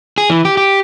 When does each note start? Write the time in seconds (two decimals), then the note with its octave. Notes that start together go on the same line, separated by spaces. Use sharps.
0.18 G#4
0.30 E3
0.45 G4
0.57 G4